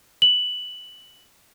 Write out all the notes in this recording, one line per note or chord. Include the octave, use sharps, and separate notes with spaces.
F#7